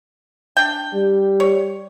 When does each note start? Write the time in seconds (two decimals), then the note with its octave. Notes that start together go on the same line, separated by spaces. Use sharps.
0.57 D4 G5
0.94 G3
1.40 C#5